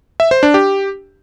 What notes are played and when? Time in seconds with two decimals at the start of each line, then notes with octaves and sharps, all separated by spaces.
0.20 E5
0.31 C5
0.43 D4
0.54 G4